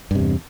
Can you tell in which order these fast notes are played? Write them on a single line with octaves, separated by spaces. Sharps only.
G2 C3 E2